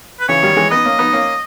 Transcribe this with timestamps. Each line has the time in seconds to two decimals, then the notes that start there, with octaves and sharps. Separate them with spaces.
0.20 B4
0.28 C#3 E3 C#5
0.42 D#3 G3
0.56 E3 G#3
0.70 B3 D#4 D#5
0.85 A#3 C#4
0.98 B3 D#4
1.12 A#3 C#4